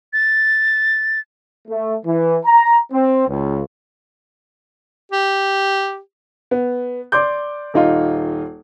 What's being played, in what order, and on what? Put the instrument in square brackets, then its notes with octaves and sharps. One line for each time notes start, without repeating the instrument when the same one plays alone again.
[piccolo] A6
[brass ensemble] A3
E3
A#5
C4
C#2
[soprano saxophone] G4
[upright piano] B3
D5 C6 D6 G6
D#1 D#4 F4